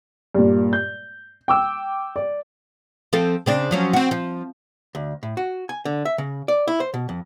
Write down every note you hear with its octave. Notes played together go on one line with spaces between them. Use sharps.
G2 A#2
G6
G5 D6 E6
D5
F3 C4 A4
C#3 C4 D4
F3 F#3 C#4
C4 F#4
F3
D2
A2
F#4
G#5
D3
E5
C#3
D5
E4
C5
B2
F2